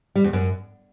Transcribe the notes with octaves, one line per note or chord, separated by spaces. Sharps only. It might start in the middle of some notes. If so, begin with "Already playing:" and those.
G3
E2
F#2